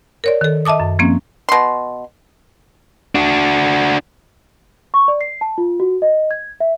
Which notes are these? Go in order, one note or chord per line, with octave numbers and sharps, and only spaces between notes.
A#4 C#5 D5
D#3 A4
D#5 E5 A5 D6 D#6
F#2
F3 A#3 C4 C#4
B2 C6
D4 F#4
C#6
D5
C7
A5
F4
F#4
D#5
G#6
E5